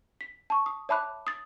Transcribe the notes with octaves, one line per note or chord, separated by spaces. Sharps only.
B6
A5 C#6
D#6
C#5 E5 A5 B5 D6 F#6
D#6 A6